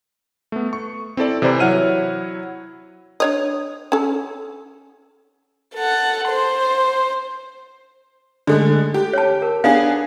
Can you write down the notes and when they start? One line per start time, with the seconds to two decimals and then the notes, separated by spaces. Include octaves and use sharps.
0.52 A3 B3
0.73 C#6
1.17 C4 E4 A4 D5
1.42 C3 E3 E4 C5 D5 B5
1.60 F#3 E4 C#5 F#5 F6 D#7
3.20 D4 C#5 D#5
3.92 C#4 A4
5.75 A4 F#5
6.29 C5 C6
8.47 D3 G#3 A3 D4 A4
8.94 G4
9.13 C#5 A5
9.42 A#4
9.64 B3 D4 G#4 F5